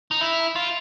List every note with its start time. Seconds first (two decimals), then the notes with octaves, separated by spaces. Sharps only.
0.11 D#4
0.21 E4
0.56 F4